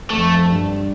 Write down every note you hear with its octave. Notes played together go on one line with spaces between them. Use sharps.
F2 A3
G2